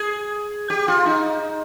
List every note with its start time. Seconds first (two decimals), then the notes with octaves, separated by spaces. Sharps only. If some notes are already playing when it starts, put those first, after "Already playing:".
Already playing: G#4
0.70 G4
0.88 F4
1.06 D#4